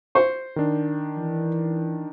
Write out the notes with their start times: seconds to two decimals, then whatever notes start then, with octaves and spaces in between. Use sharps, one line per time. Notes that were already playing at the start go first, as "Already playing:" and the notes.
0.15 C5 C#6
0.56 D#3 D4
1.17 E3